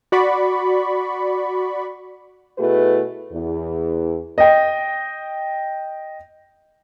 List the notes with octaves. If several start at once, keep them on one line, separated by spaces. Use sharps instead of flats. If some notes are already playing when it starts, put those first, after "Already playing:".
F#4 D5 B5 C#6
B2 A3 E4 F#4 G#4 B4
E2
D#5 G5